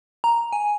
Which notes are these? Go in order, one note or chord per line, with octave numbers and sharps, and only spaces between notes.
A#5
G#5